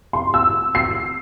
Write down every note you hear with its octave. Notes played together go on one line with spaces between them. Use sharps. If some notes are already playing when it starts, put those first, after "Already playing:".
C6
E6
C7